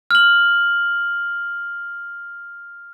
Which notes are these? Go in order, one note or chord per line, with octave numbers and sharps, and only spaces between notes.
F6 F#7